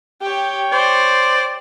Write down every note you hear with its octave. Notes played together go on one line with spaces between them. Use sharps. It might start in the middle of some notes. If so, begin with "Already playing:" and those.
G4 C#5 G5
C5 D5